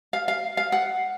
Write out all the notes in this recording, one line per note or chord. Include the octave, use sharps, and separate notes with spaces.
F5
F5
F5
F#5